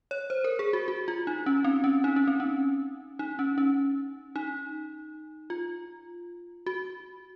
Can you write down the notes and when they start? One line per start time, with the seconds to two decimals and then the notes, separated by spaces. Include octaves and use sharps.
0.11 C#5
0.30 C5
0.44 A#4
0.59 G#4
0.73 F#4
0.88 F#4
1.08 F4
1.27 D#4
1.46 C#4
1.64 C4
1.84 C#4
2.04 D#4
2.16 C#4
2.27 C4
2.40 C#4
3.19 D#4
3.39 C#4
3.58 C#4
4.36 D#4
5.50 F4
6.66 F#4